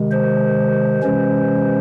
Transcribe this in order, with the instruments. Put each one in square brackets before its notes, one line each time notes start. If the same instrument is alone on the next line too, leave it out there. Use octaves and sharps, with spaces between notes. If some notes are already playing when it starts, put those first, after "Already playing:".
Already playing: [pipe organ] C3 D#3 G#3
C5
C3 E3 G#3 C#4